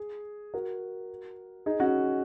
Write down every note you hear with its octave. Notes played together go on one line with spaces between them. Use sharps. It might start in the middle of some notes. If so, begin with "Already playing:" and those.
Already playing: G#4
F#4 A#4
D#4 G#4
C#4 F#4